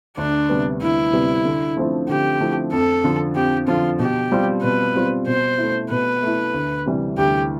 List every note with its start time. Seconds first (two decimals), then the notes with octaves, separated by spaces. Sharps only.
0.17 D2 D4
0.49 C3 G3 B3
0.81 D2 E4
1.13 C3 G3 B3
1.45 D3
1.77 F3 A3 C4 E4
2.09 D3 G4
2.40 F3 A3 C4 E4
2.73 F2 A4
3.04 D3 F3
3.35 F2 G4
3.68 D3 F3 F4
3.99 B2 G4
4.32 G3 C4 F4
4.63 B2 B4
4.95 G3 C4 F4
5.27 B2 C5
5.58 A3 E4
5.90 B2 B4
6.23 A3 E4
6.54 D2
6.86 C3 E3 G3
7.18 D2 G4